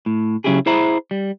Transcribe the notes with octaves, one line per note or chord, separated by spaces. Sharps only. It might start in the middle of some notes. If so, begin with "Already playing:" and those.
A2
C#3 F#3 C#4 E4 G4 G#4
E4 G#4 C5 E5 A#5 B5
G3